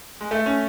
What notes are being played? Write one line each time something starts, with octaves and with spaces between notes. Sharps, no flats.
G#3
A3
C#4